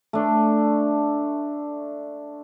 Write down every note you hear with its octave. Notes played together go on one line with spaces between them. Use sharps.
A3 D4